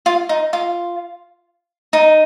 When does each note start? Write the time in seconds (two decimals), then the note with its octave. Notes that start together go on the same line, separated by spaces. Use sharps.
0.06 F4
0.29 D#4
0.53 F4
1.93 D#4